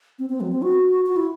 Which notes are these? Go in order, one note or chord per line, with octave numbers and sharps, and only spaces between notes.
C4
C4
F#3
C4
F#4
F#4
E4